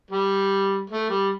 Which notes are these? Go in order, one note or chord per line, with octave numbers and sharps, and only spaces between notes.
G3
A3
G3